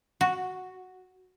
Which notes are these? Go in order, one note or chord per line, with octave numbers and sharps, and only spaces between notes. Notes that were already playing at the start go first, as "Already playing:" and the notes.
F#4